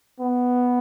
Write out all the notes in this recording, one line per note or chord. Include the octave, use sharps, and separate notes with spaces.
B3